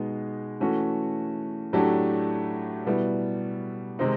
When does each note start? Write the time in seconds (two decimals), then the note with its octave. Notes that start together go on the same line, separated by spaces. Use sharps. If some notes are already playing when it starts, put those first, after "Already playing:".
Already playing: B2 G#3 B3 D#4 G#4
0.60 E3 A3 C#4 F#4
1.73 A2 F#3 A3 D4 G4
2.86 B2 G3 B3 E4
3.99 C3 D#3 G#3 C4 D#4